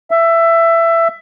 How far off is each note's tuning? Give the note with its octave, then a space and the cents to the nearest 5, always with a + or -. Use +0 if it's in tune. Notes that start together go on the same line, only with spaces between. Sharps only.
E5 +15